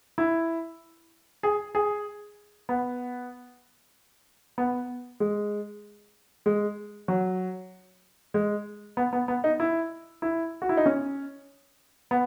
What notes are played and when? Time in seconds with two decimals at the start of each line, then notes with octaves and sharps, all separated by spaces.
0.18 E4
1.43 G#4
1.75 G#4
2.69 B3
4.58 B3
5.20 G#3
6.46 G#3
7.08 F#3
8.34 G#3
8.97 B3
9.13 B3
9.28 B3
9.44 D#4
9.60 E4
10.22 E4
10.62 F#4
10.69 E4
10.77 D#4
10.86 C#4
12.11 B3